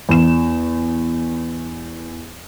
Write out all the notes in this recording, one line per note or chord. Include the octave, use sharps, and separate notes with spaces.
E2 E7